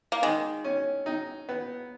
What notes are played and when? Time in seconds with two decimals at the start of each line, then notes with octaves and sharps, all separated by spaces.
0.12 A#3
0.22 D#3 G#3
0.64 C#4
1.06 D#4
1.49 B3